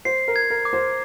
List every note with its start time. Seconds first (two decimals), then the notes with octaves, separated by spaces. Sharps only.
0.05 C5 C7
0.28 A#4
0.36 G#6
0.50 A#4
0.65 D6
0.73 C5